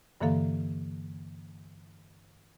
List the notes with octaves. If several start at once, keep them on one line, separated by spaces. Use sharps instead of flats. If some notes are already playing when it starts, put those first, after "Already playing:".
G2 D3 E3 A#3 A4 F5